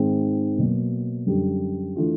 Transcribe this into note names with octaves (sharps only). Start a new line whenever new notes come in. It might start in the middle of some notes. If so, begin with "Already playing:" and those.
Already playing: G#2 D#3 G#3 C4
B2 F#3 A#3
F#2 D3 G3
E3 A3 D4 F4